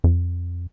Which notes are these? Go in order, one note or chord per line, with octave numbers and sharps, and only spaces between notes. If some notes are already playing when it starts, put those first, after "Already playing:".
F2